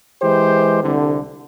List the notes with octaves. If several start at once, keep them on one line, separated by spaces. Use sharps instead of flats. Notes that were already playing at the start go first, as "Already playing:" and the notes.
E3 G#3 G4 C5
C2 D3